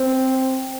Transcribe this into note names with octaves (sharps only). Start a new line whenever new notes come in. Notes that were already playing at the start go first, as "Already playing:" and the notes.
Already playing: C4